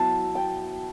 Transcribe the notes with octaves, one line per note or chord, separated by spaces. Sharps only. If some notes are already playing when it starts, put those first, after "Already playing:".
Already playing: F#3 B3 E4 A5
G5